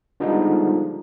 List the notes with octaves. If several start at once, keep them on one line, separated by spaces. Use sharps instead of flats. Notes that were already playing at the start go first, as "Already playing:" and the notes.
D3 F3 G3 G#3 B3 D#4